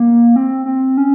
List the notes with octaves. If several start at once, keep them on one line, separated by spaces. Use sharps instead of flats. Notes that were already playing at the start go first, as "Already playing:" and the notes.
Already playing: A#3
C4
C4
C#4